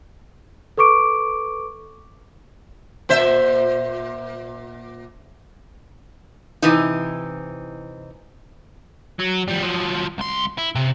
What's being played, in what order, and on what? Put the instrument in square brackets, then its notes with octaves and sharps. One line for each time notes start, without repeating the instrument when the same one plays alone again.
[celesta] A4 B4 C#6 D6 D7
[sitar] A#2 C5 E5
[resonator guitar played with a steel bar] C3 E3 D#4
[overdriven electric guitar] F#3
F3 G3
F3 F#3
C2 C6
E4
C3